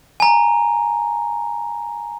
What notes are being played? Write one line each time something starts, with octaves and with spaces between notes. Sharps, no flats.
G#5 A#5